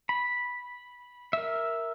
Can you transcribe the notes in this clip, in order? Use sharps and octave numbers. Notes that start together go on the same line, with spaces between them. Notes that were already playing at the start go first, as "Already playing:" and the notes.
B5
A#4 E5